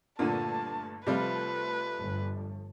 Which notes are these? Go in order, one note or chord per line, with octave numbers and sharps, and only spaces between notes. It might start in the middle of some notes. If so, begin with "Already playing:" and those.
G2 A#2 D3 A3 A5 D#7
C3 F3 G3 A3 F4 B4
G1 G2